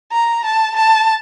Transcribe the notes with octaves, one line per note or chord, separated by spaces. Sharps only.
A#5
A5
A5